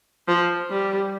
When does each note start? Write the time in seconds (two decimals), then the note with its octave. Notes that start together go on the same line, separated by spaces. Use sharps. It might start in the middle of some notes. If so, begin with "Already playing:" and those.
0.28 F3
0.70 G3